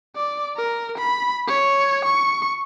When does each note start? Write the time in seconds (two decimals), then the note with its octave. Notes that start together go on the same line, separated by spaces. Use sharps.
0.16 D5
0.57 A#4
0.98 B5
1.47 C#5
2.05 C#6